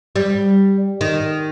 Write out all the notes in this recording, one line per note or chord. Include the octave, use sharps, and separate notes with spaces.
G3
D#3